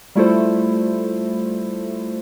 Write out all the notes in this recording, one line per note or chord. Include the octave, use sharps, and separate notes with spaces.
G3 A3 E4 F4 A4 C5